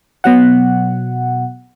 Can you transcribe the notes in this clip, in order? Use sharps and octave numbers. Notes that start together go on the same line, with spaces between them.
B2 F#3 F#5